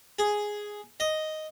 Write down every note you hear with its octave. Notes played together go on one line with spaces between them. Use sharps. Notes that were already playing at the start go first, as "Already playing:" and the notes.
G#4
D#5